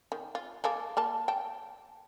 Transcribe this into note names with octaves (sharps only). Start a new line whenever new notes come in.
D#3
F4
G#3 A#3 A4
A#3 A#4 A5
G5 A5